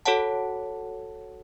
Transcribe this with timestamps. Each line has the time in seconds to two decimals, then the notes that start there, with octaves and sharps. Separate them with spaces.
0.05 F#4 A4 C#5 F#5 A5